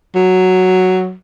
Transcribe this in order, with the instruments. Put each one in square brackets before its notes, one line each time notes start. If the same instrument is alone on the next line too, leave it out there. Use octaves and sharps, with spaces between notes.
[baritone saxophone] F#3